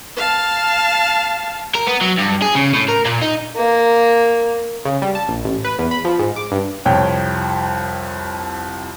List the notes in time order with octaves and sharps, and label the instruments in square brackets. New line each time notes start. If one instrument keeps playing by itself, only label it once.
[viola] F5 A5
[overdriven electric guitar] A#4
B3
F#3
G2
G#4
C#3
A2
A#4
A#2
D#4
[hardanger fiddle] A#3
[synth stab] C#3
G3
A5
A#1
A1
B4
E2
B5
F3
G#2
D6
G2
[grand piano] C2 F2 C#5 G5